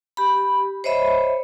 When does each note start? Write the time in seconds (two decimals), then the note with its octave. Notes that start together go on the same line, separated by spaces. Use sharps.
0.17 G4 B5
0.84 C5 C#5 D#5 E5 B5